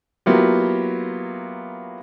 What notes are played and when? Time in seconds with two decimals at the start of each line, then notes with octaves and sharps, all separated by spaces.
0.26 F#3 A#3 B3 E4 F4 G4